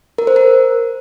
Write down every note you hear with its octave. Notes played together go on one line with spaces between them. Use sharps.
A#4
C5
A#4